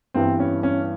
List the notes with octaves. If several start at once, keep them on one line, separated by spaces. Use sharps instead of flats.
G2 E3 G3 B3 C4
C#4
C#4